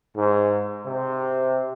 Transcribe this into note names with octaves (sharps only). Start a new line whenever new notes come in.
G#2
C3